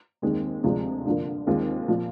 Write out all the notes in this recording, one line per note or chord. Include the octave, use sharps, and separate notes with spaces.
D#2 D#3 G#3 C4
D2 C3 F3 G#3 D4
G2 D3 F3 A#3
D#2 D#3 G#3 C4 F4
A#2 F3